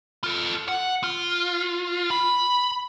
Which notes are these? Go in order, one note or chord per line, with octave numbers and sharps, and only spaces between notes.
F4 A4
F#5
F4
B5